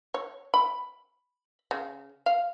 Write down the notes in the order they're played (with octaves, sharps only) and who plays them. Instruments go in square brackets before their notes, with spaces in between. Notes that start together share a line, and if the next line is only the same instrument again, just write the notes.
[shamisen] C#5
B5
C#3
F5